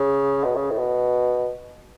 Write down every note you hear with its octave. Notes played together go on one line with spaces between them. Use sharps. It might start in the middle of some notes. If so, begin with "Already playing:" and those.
Already playing: C#3
B2
C#3
A2
B2